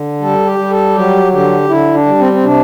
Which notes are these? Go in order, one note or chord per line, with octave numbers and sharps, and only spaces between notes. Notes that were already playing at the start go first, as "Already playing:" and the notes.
Already playing: D3
G3 A4
G4
G3
A4
F#3 G4
D3 G4
D3 E4
D4
G3
C4
C4
C3 D4